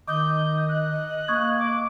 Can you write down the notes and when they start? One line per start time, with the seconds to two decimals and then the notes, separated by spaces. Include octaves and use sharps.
0.08 D#3 D#5 D6 D#6 G6
0.68 F#6
1.28 A#3 C#6 D#6 G#6
1.58 D6